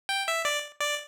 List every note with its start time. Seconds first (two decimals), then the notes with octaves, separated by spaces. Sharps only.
0.09 G5
0.28 E5
0.45 D5
0.81 D5